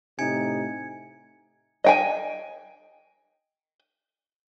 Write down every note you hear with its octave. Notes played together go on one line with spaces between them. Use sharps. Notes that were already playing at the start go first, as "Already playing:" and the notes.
A2 C3 D#4 G#5 G#6 C#7
D#5 G5 G#5